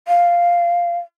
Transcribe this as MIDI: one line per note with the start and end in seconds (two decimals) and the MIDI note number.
0.08 0.98 77